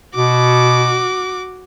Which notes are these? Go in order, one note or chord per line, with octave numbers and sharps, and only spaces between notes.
B2 F#4 D6